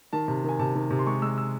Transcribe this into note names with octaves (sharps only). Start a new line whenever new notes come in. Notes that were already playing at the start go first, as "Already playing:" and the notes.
D#3 A5
C3
D#3
G#5
C3 A5
D#3
C3
C6
G#3 C#6
G#3 E6
E6